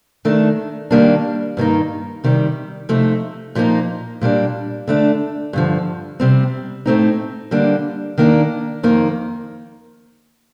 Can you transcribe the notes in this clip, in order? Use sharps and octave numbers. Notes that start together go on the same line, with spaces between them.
D#3 A3 D4
D#3 G3 A#3 D4
G2 D#3 A#3 D#4
C3 D#3 G3
C3 F3 A3 D#4
A#2 F3 A#3 D#4
A#2 G3 A#3 D4
D3 A3 D4
G2 D3 F3
C3 G3 C4
A2 A3 C4 D#4
D3 G3 A#3 D4
D#3 A#3 D4
F2 D#3 A#3 D#4